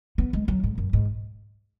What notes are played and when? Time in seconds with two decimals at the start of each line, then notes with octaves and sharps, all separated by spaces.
0.18 B3
0.33 G#3
0.48 F#3
0.64 G#2
0.78 F#2
0.93 G#2